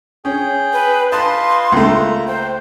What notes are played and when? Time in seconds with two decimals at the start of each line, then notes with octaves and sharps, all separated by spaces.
0.25 C#4 G#4 G5
0.73 B4
1.12 F4 B4 D#5 A5 C6
1.72 C#2 A3 A#3 A#5
2.28 C5 G5